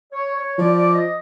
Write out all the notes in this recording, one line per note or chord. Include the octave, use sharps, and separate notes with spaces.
C#5
C#5
F3 D5
D5
D#5